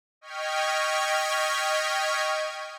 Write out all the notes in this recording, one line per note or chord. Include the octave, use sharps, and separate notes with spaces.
D#5 G5 C#6 F6 G#6 B6